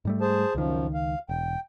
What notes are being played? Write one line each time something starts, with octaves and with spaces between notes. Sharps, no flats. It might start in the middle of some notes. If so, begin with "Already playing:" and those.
G#2 G3 A3
G#4 C5 A5
C#2 F#2 D#3 F3
F5
E1 G5